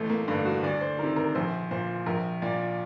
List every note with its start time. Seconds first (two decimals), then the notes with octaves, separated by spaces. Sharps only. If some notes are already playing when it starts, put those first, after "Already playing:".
Already playing: A1 A3
0.09 A#3
0.28 G2 D3 D4
0.45 F#4
0.63 D2 D5
0.81 C5
0.99 C3 D#3 A#4
1.16 A#4
1.35 A#1 C5
1.71 A#2 C5
2.06 A#1 A#4
2.42 A#2 D5